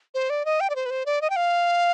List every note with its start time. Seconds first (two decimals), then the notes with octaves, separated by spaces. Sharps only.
0.14 C5
0.30 D5
0.45 D#5
0.60 G5
0.70 D5
0.75 C5
0.86 B4
0.90 C5
1.06 D5
1.21 D#5
1.30 G5
1.36 F5